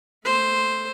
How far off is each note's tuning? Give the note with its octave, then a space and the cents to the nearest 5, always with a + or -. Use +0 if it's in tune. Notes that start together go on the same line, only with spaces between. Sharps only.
A3 +0 C5 +0